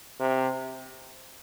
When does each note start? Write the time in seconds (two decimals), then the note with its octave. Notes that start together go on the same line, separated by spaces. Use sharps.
0.20 C3